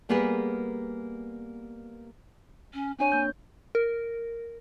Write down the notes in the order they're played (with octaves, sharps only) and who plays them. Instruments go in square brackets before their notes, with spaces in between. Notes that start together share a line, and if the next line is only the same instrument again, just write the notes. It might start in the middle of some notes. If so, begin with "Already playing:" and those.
[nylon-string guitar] G3 A#3 B3 G#4 A#4 B4
[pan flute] C#4
[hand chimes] C4 D4 C#5 [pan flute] G#5
[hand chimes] A#3 G6
[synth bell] A#4